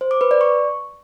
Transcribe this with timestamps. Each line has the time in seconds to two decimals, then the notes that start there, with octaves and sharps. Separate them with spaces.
0.01 C5
0.11 D6
0.21 B4
0.31 D5
0.41 C#6